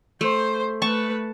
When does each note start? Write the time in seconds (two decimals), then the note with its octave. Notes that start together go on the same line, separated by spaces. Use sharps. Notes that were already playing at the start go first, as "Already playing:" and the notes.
0.21 A3 C5
0.82 A3 B4 A5 C#6